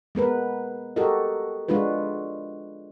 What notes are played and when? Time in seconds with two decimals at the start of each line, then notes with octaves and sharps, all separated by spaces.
0.15 G#3 B3 A#4 B4
0.96 F#4 G4 A4 A#4 D#5
1.69 G#3 D4 F4 F#4 B4